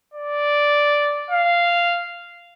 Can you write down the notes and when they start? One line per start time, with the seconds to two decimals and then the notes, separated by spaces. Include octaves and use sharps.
0.14 D5
1.31 F5